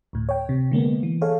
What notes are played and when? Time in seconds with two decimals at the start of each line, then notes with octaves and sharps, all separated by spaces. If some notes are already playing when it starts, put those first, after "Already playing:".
0.13 D2 A2
0.29 C#5 G5
0.49 C3
0.71 D3 G#3 A#3 B3
1.03 E3
1.21 G#4 A4 C#5 F5